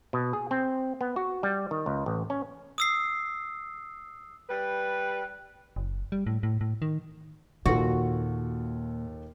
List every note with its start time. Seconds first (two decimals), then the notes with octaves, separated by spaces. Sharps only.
0.13 B2
0.33 G#4
0.51 C4
1.01 B3
1.16 F#4
1.43 G3
1.71 D#3
1.86 C#2
2.06 A1
2.30 C#4
2.78 D#6 E6 C7
4.49 G3 B4
5.76 F#1
6.12 G3
6.27 A2
6.43 A2
6.61 A2
6.82 D#3
7.66 D#2 A#2 F4 F#4 A4